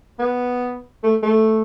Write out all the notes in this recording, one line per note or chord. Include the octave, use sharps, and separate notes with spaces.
B3
A3
A3